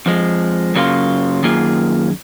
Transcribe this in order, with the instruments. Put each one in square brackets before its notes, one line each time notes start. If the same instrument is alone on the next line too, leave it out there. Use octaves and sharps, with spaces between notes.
[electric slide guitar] F2 F3 G#3
F#2 C#3 F#3 A#3 F4
F#2 D#3 A#3 F4 G#4